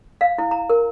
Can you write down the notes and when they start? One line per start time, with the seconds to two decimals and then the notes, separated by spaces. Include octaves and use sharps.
0.21 F5
0.38 E4
0.51 A#5
0.69 A#4